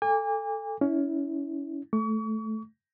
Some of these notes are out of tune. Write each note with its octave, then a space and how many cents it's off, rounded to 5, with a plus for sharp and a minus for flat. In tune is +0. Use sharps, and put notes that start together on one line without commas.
A4 +0 G#5 -40 D6 -15
C#4 +25 E4 -20
A3 -10 C#6 +40